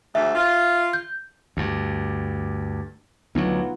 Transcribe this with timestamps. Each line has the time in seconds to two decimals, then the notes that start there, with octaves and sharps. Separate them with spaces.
0.15 D2 G#2 A3 E5
0.35 F4
0.93 G6
1.57 D2 G2
3.35 D2 F#3 B3 D#4 F4